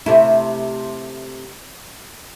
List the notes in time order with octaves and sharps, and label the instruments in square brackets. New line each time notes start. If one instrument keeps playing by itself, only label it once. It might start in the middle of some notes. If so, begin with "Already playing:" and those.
[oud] C3 A3 E4